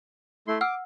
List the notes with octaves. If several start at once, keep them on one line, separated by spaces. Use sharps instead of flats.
A3 E4 C6
F#5 D6 E6 F6